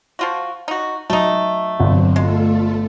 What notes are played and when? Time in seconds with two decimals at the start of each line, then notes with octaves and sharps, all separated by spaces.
0.19 F3 F4 F#4
0.68 D#4 F#4
1.10 F#3 A3 D#4
1.80 G1 F#3 C4
2.16 G#3 A3 F4 A4